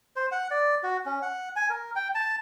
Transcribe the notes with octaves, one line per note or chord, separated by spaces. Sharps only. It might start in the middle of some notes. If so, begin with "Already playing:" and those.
C5
F#5
D5
F#4
C#4
F#5
G#5
A#4
G5
A5